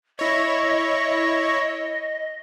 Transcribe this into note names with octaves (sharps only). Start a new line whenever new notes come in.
E4 C#5 D#5